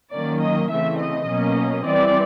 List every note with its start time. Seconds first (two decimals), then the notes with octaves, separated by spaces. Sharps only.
0.13 D#3 F#3 A#3 C#4 D5
0.42 D#5
0.70 C#3 E3 A3 C4 E5
0.99 D#5
1.28 B2 F#3 A#3 C#4
1.85 E3 G3 C4 D5